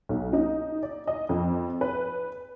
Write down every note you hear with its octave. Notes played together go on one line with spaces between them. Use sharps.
B1
D#4
D5
D#5
F2
B4